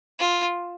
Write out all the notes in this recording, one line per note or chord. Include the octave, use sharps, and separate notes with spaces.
F4